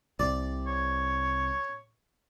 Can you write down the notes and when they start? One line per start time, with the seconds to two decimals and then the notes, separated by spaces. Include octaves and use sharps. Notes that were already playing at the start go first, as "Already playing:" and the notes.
0.19 C2 C3 D5
0.67 C#5